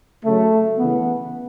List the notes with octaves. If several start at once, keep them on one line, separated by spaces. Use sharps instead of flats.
C#3 F#3 A3
C#3 E3 B3